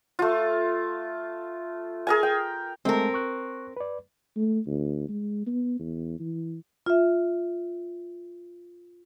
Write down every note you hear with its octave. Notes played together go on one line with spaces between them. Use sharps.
A3 F4
G#4 A#4 G#5
G5
G#3 A3 C4 A#4 A5
C#6 F#6
B4 D5
A3
D2
G#3
B3
E2
E3
F4 E5